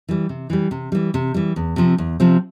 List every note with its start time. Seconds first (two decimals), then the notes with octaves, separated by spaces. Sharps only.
0.09 E3 G3
0.29 C3
0.50 E3 G3
0.71 C3
0.92 E3 G3
1.14 C3
1.34 E3 G3
1.56 E2
1.76 C3 F3 C4
1.98 E2
2.20 C3 F3 C4